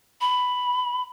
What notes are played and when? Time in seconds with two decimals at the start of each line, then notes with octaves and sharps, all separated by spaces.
0.21 B5